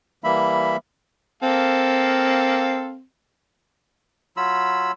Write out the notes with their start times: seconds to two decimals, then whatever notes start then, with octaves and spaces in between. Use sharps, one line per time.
0.24 E3 G3 A#3 E5 B5
1.43 A#3 C4 A4 F5
4.37 F#3 F4 B5 E6